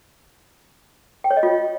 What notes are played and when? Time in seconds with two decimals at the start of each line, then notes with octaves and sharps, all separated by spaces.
1.24 G5
1.31 C#5
1.37 D#5
1.43 F4